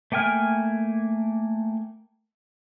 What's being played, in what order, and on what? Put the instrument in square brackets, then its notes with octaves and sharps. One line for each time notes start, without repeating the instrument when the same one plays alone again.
[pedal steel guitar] A3 A#3 G5 G#5 F6